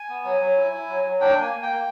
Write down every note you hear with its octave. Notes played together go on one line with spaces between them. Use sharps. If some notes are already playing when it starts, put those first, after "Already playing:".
Already playing: G#5
B3
F#3
F#3
E4
E4
F#3
F#3
D4 G5
A#3 G#5
A#3
G5
A#3